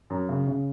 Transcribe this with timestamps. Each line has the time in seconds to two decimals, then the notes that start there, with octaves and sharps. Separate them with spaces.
0.10 F#2
0.29 C#3
0.47 C#3